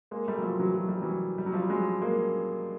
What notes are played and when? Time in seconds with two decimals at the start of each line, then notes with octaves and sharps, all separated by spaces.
0.11 G#3 A#3
0.28 G3 A3
0.39 F#3
0.43 F3 G3
0.59 E3 F#3
0.75 F#3
0.89 G3
1.02 E3 F#3
1.38 G3
1.46 F#3
1.53 F3 G3
1.70 F#3 G#3
2.02 G#3 A#3